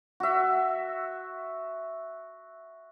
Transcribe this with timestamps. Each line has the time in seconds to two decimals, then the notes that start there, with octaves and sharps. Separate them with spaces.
0.20 F#4 E5